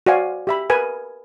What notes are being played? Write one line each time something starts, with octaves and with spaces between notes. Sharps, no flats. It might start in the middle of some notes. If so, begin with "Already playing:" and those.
F#4 C5 D5 F5 G#5
G4 E5 B5
A#4 B4 G#5